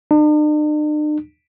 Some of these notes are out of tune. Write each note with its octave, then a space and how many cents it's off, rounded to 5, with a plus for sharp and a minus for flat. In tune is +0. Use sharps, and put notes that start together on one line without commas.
D4 +45